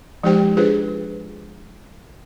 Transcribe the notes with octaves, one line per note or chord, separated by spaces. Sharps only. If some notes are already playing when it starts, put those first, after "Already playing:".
F3 G#3 D#4 G4 C5 G5
D4 F4 G#4 B4 C5